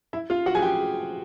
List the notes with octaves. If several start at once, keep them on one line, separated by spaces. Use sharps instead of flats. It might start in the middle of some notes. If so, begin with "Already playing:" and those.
E4 E5
F4 F5
F#4 F#5
G#4 G#5
G4 G5